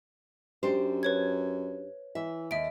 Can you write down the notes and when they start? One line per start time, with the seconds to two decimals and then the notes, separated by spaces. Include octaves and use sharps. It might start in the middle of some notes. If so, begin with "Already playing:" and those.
0.63 F#2 D4 G4 C5
1.03 B4 C#5 G#6
2.15 E3 E5
2.51 D#2 E5 D7